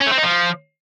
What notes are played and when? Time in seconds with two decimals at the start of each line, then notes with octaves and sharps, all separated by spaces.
0.01 C#4
0.06 A3
0.12 C4
0.18 D#4
0.23 F3